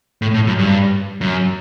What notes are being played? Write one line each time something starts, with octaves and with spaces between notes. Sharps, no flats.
A2
A2
F#2
G2
F#2